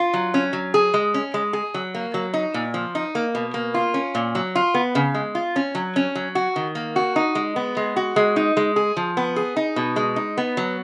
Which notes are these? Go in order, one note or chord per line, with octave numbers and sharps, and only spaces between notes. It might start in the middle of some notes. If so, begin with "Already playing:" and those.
Already playing: F4
F#3
C#4
F#3
G#4
G#3
C#4
G#3
G#4
F#3
A#3
F#3
D#4
A#2
F3
D#4
A#3
B2
A#3
F4
C#4
A#2
F#3
F4
B3
C#3
G#3
F4
C#4
F#3
C#4
F#3
F#4
D#3
A#3
F#4
D#4
G#3
B3
G#3
F#4
G#3
D#4
G#3
G#4
F3
B3
G#4
D#4
B2
G#3
D#4
B3
F#3